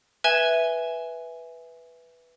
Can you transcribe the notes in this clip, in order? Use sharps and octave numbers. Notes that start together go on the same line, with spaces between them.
B4 E5 G#5 G#6 E7 G7